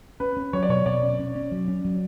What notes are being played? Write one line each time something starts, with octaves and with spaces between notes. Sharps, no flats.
C#4 B4
C#4
F#3 C#5
D5
B2 C#5
B2 D5
C#4
C#4
C#4
F#3
C#4
F#3